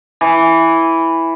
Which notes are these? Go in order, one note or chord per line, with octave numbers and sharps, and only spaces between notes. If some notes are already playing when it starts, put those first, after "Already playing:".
E3